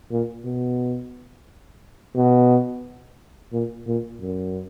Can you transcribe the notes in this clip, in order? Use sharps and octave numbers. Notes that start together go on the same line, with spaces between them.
A#2
B2
B2
A#2
A#2
F#2